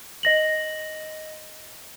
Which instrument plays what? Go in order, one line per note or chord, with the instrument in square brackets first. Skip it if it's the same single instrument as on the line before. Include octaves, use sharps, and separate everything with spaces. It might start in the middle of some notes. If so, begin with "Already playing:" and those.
[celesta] D#5 A#6 F#7